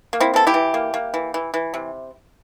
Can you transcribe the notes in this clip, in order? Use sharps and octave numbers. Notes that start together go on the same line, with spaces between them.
A#3
C4 E4
E3 A4
E4 G4
E3
A#3
A#3
E3
E3
E3
C3